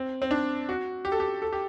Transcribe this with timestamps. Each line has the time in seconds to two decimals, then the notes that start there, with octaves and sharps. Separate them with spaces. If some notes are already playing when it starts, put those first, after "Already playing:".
Already playing: C4
0.22 C4
0.31 D4
0.69 F#4
1.05 G4
1.12 A4
1.20 G4
1.42 A4
1.53 G4